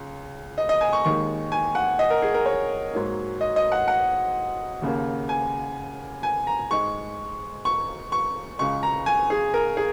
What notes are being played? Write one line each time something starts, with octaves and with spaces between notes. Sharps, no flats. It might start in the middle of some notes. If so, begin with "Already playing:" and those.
Already playing: C#2 C#3
D#5
D#5
G#5
C#6
D#2 D#3 G#3 C#6
G#5
F#5
D#5
A#4
G#4
A#4
C#5
G#2 F#3 A#3
D#5
D#5
F#5
F#5
D#2 C#3 A#3
G#5
G#5
A#5
G#2 G#3 C#6
C#6
C#6
C#2 C#3 G#3 C#6
A#5
G#5
G#4
A#4
G#4